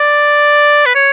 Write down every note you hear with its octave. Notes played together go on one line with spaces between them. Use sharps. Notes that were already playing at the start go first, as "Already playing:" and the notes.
Already playing: D5
B4
C#5